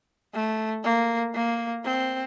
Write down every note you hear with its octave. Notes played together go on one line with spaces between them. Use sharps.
A3
A#3
A#3
C4